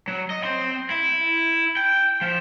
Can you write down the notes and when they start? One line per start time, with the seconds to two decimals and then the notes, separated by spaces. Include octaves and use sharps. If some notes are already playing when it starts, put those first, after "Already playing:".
0.08 F#3
0.30 D#5
0.44 C4 C6
0.91 E4
1.77 G5
2.21 F3